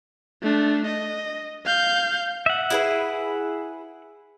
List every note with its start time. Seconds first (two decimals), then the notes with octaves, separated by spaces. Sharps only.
0.42 A3 D4
0.86 D#5
1.66 F5 G6
2.46 E5 F#5
2.70 E4 G#4 B4